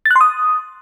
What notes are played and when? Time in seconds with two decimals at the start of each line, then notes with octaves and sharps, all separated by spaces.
0.06 A6
0.11 F#6
0.16 C6
0.21 D#6